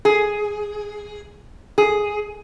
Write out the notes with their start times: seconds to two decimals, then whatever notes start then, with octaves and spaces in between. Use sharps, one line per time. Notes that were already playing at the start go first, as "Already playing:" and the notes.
0.05 G#4
1.78 G#4